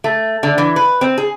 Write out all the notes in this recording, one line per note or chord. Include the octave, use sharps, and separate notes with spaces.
A3
D3
E3
B4
C4
G#4